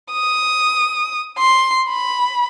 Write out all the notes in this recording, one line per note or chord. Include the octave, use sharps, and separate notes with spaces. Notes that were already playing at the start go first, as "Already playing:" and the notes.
D#6
C6
B5